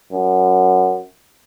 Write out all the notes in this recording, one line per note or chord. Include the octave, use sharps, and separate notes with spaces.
F#2